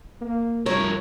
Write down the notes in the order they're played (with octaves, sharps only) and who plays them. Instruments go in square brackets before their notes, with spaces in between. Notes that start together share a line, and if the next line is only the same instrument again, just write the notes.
[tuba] A#3
[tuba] F1 [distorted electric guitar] G2 A#4 [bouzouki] C#5